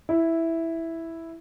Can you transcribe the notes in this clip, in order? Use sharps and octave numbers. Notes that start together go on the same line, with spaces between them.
E4